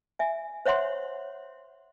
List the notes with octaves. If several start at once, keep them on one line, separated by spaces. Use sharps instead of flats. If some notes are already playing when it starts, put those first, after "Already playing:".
E5 G#5
C5 C#5 E5 F#5 C6